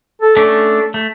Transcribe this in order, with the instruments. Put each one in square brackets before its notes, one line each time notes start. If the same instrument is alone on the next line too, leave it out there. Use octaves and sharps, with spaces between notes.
[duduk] A4
[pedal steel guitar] A3 C#4 D4 [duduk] A4
[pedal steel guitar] A3